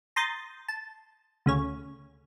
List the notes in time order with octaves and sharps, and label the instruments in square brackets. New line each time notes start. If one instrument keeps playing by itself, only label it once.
[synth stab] A#5 C6 D#6 G6 A6
A5
D2 C#3 C#5